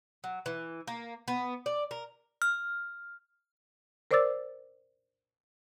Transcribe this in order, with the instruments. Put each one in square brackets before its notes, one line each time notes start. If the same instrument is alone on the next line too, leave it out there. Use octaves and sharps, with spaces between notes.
[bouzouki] F#3
E3
A#3
B3
D5
A#4
[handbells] F6
[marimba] A#4 C5 D5 D6 E6 A6